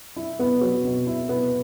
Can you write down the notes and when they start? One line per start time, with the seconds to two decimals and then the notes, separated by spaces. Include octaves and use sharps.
0.16 E4
0.39 B3
0.61 F#3
0.85 B2
1.07 E4
1.29 B3